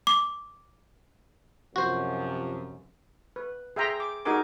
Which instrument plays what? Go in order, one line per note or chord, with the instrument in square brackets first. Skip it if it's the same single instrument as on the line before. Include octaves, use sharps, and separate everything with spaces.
[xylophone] D6
[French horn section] F#2 C3 F3 [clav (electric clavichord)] F#4 C5
[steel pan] B4
G#4 E5 G5 A#5 C6
D6
D#4 F#4 G#4 A#4 G#5 D6